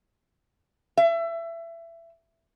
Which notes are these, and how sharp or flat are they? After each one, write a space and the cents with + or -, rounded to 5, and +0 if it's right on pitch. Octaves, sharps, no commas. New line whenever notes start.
E5 +25